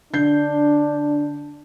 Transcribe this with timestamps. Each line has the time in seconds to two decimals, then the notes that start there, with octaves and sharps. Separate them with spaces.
0.13 D3 D4 G6 C7